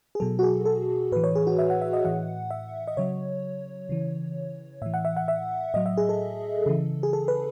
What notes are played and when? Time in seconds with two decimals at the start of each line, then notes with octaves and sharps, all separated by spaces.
0.15 G#4
0.20 B2 F#3 A4
0.39 F#4
0.43 G#4
0.65 A4
1.12 A2 E3 B4
1.24 C#5
1.35 G#4
1.47 F#4
1.58 E5
1.70 F#5
1.82 E5
1.93 D#5
2.04 A2 E3 F#5
2.51 E5
2.87 D#5
2.97 C#3 F#3 C#5
3.89 C#3 E3
4.82 A2 E3 E5
4.94 F#5
5.05 E5
5.17 F#5
5.28 E5
5.74 A2 F#3 D#5
5.86 E5
5.97 G#4
6.09 A4
6.66 C#3 E3
7.03 G#4
7.13 A4
7.28 B4